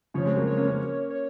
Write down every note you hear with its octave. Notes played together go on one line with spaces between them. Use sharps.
C#3 F3 C#5
G#3 C4
F#3 A#3
C#5
A#3 C#4
A#3 C#4
C#5